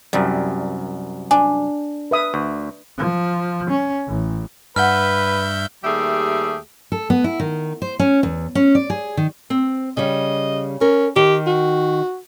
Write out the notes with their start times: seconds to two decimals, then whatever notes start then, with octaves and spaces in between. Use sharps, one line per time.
0.13 C2 F#2 G3
1.31 D4 G#5
2.11 B4 E5 D#6
2.34 D2
2.98 F3
3.70 C#4
4.07 A1
4.76 G2 B4 E5 F#5 A5 F6 G6
5.84 D#2 G3 A3 G4 G#4 E5
6.92 A4
7.10 B3
7.24 E4
7.40 D#3
7.82 C5
7.99 C#4
8.23 E2
8.55 C#4
8.75 D5
8.90 G#4
9.17 D#3
9.50 C4
9.97 C#3 G3 D#5
10.81 C#4 A#4
11.16 D#3 G4
11.47 F#4